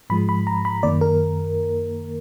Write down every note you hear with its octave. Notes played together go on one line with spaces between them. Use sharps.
G#2 F3 G#3 B5
B5
A#5
B5
F#2 D#3 A#3 D5
A#4